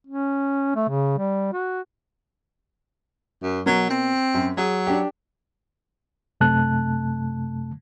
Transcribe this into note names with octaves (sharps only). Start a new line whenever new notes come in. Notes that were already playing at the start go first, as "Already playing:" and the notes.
C#4
A3
C#3
G3
F#4
F#2
B2 F#3 A#4
C4
F#2
F#3 G#4
D4 G4
F#2 C3 A3 A5 F#6